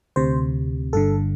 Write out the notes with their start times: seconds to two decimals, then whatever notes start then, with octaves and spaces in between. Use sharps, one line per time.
0.16 D2 C3 C5
0.93 G1 G2 D3 A4